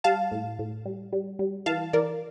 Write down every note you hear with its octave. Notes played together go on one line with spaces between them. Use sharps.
G3 F5 A5
A2
A2
G3
G3
G3
E3 F5 A5
E3 A#4 D5